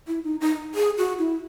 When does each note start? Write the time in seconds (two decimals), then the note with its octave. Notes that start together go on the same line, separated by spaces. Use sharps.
0.08 E4
0.24 D#4
0.41 D#4
0.75 G#4
0.98 F#4
1.19 E4